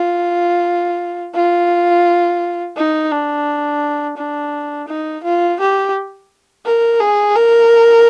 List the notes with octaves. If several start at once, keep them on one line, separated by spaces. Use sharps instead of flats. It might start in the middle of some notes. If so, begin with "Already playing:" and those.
Already playing: F4
F4
D#4
D4
D4
D#4
F4
G4
A#4
G#4
A#4